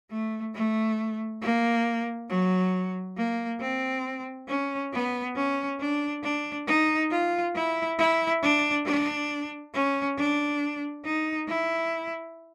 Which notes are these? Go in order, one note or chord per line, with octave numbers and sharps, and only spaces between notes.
A3
A3
A#3
F#3
A#3
C4
C#4
B3
C#4
D4
D4
D#4
F4
E4
E4
D4
D4
C#4
D4
D#4
E4